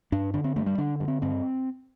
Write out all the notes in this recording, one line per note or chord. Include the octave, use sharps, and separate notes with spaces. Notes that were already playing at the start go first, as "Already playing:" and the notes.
G2 D4
D3 D4
C4
G2 A3
G3
D3 D4
G2
C4
G2 C4